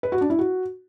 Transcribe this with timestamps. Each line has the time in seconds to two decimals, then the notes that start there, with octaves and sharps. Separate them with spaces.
0.03 B4
0.12 F#4
0.21 D4
0.30 E4
0.39 F#4